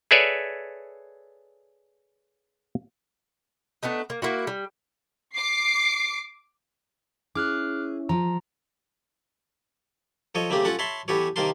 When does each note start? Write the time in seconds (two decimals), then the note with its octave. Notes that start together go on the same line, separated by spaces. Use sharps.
0.11 G#4 A4 B4 C#5 D5 E5
3.83 A3 B3 D4 D#4
4.10 A#3
4.22 A#3 E4 F#4
4.47 G3
5.35 D6 C7
7.35 C#4 E4 G#4 D6 F6 F#6
8.09 F3 A#5
10.35 F3 A4 C#5 D#5
10.50 C#3 A3 A#3 C4 G4
10.65 C#4 F4 A4 F#5 A5
10.79 C#5 E5 A5 B5 C6
11.08 E3 B3 G4 A4 C#5
11.36 C3 D#3 A#3 A#4 A5 C6